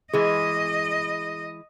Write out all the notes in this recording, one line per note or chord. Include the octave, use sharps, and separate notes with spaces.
E3 G#3 G#4 D#5